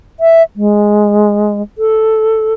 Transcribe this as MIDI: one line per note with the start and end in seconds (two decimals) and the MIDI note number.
0.20 0.43 76
0.56 1.62 56
1.78 2.54 69